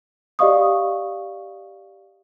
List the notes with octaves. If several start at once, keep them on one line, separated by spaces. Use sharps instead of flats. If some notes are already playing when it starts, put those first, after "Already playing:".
G4 D5 D#5 F5 C#6 D#6